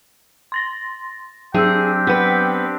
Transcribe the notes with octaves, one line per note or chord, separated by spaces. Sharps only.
C6 A6 A#6
F#3 C4 D4 G4 G#4 G5 E6
B3 B4